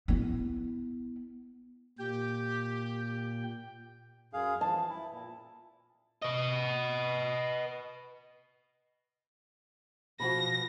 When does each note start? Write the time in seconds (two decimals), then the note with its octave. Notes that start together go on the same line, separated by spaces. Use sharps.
0.08 B3 E4
1.99 A#2 G4 G5
4.33 F#2 G#4 F5
4.61 E3 F3 A5
4.89 E4
5.12 A#2
6.22 B4 D#5
10.20 B2 F3 F#4 F#5 B5 A#6